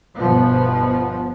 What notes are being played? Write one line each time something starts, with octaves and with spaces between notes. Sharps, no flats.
G1 B2 F3 B3